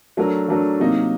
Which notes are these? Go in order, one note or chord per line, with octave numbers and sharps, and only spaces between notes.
F#3 A3 D4 F#4 A#4
F#3 A3 D4 F#4 A#4
C3 F#3 A#3 D#4